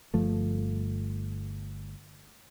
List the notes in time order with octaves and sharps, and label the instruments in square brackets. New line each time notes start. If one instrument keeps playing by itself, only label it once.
[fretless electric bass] G1 G2 F3 A3